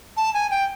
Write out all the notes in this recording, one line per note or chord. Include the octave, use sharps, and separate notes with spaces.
A5
G#5
G5